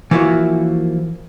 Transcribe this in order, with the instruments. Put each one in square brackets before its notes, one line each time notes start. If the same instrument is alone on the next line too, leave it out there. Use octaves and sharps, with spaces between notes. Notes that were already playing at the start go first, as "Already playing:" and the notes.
[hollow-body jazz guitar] E3 F3 A#3 E4 F#4 C#5